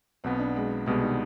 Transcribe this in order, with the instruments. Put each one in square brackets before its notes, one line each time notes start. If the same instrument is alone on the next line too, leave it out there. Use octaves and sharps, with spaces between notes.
[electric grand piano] B1 B2 B3 [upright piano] C4
[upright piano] D4
G#3
[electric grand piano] C2 B2 G3 B3 [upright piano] G#3
[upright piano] D#3